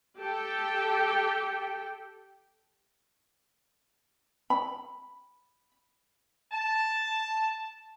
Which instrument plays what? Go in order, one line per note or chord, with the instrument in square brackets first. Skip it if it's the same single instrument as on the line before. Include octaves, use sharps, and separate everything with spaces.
[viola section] G4 A4 G5
[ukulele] B5
[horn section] A5